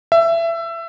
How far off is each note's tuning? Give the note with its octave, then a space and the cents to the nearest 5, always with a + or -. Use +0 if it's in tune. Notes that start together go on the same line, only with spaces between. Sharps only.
E5 +20